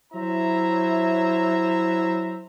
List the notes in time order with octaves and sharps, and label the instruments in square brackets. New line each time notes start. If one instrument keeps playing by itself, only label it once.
[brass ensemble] F#3 E4 C5 E5 A#5